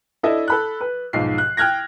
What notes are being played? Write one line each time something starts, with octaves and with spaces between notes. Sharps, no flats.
D4 E4 A4 D#5 E5
A4 B5 F#6
B4
B1 G#2 F3 C7
F#6
G5 F6 F#6 G#6 A#6